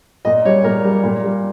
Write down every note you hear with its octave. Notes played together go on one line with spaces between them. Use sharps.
A#2 D#5
G3 C#5
A#2 A#4
G3
A#2
G3